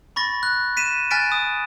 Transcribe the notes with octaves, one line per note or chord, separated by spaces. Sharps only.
B5 C#6 A6 A#6
F#6
B6 D#7 E7
G#5 F6 F#6 A6 B6 D7
D#6